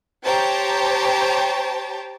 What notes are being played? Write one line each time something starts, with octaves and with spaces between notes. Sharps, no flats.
G4 C5 C#5 G5 A5 A#5